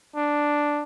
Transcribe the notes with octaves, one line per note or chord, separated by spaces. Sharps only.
D4